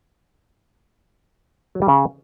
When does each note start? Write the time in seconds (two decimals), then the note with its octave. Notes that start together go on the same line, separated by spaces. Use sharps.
1.75 F#3
1.82 G3
1.88 C#3